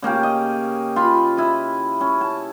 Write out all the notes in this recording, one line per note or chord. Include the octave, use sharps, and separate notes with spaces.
C#3 A#3 C#4 G4
D#5
F4 B5
E4 D#5
C#4
A5